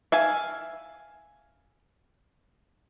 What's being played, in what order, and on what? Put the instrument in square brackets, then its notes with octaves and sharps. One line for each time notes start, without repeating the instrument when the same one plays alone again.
[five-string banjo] E5 F5 G#5